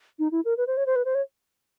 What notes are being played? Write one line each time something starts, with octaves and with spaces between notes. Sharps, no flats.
D#4
E4
A#4
B4
C5
C#5
C5
B4
C5
C#5